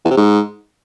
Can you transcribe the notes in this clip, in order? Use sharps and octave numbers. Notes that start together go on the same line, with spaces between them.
E2
C3
G#2